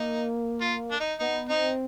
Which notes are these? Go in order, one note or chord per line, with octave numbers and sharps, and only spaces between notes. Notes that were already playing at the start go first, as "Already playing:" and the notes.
Already playing: A#3 D#4
F4
D4
D#4
B3 D#4
C4 D#4